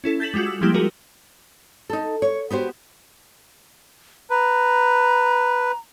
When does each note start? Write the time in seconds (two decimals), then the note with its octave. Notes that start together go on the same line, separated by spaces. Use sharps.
0.04 C#4 E4 A4
0.20 G6 A6 B6 E7 F#7
0.34 G3 G#3 F4 F#4
0.46 E6
0.61 F3 G3 G#3 A#3 E4 G4
0.74 F#4 G#4 A#4
1.90 D#4 A4
2.22 C#5
2.50 B3 F#4 G4 C5
4.30 B4 A#5